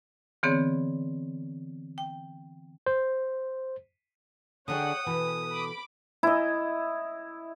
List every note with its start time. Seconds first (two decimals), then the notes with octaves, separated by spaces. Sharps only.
0.43 D3 E3 B3 C4 G#4 C#5
1.98 G5
2.86 C5
4.68 D3 D4 G#4 C#5 F#5 G5 D#6
5.06 B2 E3 A4 B4
5.52 B5 D6
6.23 E4 D#5